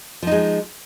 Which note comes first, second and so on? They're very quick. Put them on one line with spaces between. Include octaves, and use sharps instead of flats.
F3 D#4 G#3